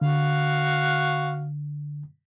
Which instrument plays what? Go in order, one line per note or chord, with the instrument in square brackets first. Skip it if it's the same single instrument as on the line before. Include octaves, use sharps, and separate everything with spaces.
[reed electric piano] D3 [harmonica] F#4 F5